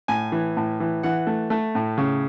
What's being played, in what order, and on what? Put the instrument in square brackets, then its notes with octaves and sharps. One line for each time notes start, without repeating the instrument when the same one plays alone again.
[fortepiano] A2 G#5
E3
A2
E3
E3 F#5
A3
A3
A2
C#3